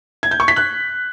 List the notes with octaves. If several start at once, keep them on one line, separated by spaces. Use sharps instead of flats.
G#6
G6
C#6
B6
F#6